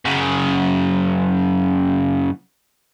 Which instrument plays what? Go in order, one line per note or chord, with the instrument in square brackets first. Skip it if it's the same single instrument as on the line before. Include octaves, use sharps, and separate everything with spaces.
[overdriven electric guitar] F#2 C#3